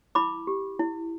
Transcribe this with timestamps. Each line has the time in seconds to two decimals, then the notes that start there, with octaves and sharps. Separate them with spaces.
0.15 E4 B5 D6
0.47 G4
0.79 E4